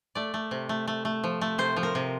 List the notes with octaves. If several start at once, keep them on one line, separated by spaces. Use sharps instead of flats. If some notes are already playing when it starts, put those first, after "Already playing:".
A3 D5
A3
C3
A3
A3
A3
F3
A3
C3 C5
F3
A#4
C3